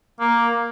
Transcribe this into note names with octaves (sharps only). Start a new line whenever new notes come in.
A#3